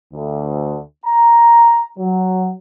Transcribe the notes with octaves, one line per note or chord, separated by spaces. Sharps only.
D2
A#5
F#3